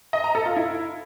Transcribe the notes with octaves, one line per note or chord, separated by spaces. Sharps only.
D#5
A#5
A4
F4
E4